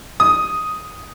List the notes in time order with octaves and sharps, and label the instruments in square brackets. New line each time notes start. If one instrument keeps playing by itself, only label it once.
[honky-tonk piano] D#6